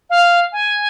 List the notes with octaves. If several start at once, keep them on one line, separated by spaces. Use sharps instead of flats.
F5
G#5